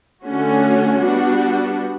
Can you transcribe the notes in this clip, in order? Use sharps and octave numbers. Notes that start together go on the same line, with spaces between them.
D3 A3 C#4 F#4
G3 B3 D4 F#4